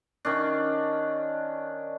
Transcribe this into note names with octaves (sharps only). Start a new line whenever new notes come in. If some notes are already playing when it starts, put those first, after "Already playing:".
D#3 C#4 D4